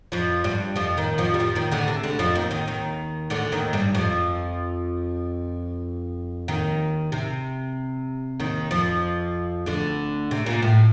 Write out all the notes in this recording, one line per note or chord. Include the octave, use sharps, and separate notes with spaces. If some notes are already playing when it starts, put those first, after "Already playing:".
F2 F3
G2 G3
F2 F3
D#2 D#3
F2 F3
G3
F2 F3
D#2 D#3
D2 D3
C3
D2 D3
F2 F3
D#2 D#3
D#2 D#3
D#2 D#3
D2 D3
D#2 D#3
G2 G3
F2 F3
D#2 D#3
C3
D#2 D#3
F2 F3
D2 D3
C3
A#2
A2